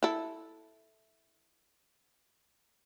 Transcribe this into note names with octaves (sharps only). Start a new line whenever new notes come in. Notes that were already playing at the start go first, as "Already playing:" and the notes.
E4 A4